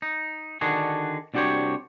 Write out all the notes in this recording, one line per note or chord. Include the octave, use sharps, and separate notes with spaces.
D#4
D3 D#3 D4 F#4 G#4
C2 D4 F#4 G4 C5 C#5